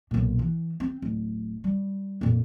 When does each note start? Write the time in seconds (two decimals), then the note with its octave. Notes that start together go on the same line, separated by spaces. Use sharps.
0.11 B1 A#2
0.39 E3
0.80 C4
1.02 D1
1.64 G3
2.21 F2 A#2